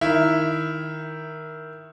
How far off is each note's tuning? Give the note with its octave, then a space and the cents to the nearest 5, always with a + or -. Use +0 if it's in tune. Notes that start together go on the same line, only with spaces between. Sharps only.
D#3 +0 E4 +0